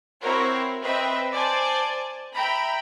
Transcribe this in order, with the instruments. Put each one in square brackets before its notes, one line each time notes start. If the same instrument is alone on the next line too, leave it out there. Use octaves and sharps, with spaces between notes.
[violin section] C4 E4 F#4 A#4 C5 C#5
C4 B4 D#5 E5 G5
C5 D5 G#5 A5
E5 G5 A#5 B5